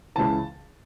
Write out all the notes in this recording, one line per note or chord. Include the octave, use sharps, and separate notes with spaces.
C#2 C#3 E3 A5